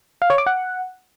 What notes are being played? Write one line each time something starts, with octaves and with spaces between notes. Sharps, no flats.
F5
C#5
D6
F#5